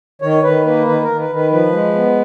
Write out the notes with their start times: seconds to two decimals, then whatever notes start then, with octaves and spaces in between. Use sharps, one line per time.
0.22 D#3 C#5
0.43 D#3 B4
0.65 A#3 B4
0.86 D#3 B4
1.03 A#4
1.08 D#3
1.19 B4
1.29 D#3
1.35 B4
1.51 F3 B4
1.72 G#3
1.94 B3